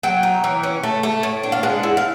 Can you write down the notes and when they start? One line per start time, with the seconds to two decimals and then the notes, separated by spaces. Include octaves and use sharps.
0.03 F#3 G5
0.23 D#4
0.44 E3
0.63 C#4
0.83 A3
1.03 A3
1.23 A2
1.43 D4
1.52 F5
1.63 G#3 F#5
1.83 E4
1.97 F5